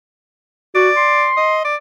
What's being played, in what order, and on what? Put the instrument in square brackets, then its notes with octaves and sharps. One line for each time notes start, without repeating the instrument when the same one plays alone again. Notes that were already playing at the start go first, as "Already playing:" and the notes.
[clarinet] F#4 [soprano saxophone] D5
[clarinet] C6
[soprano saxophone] D#5
D5